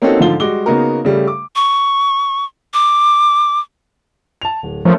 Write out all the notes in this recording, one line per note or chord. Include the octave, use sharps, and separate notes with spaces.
A#3 C4 C#4 D#4 F#4 A4
G#2 D3 F3 F4 G7
G3 G#3 F#4 D6 G7
C#3 A#3 B3 D#4 F#4 A#4
C#3 G3 A3
D6
C#6
D6
A5 F7
D1
F3 A3 C#4 A#4